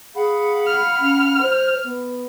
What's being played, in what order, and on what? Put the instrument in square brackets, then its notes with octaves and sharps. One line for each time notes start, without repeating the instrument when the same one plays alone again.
[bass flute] G#4 [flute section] F5 F#5 B5
[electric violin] F6
[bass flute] C#4
C5
B3